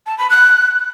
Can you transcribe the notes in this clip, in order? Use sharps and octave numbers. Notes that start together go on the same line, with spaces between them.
A5
B5
F#6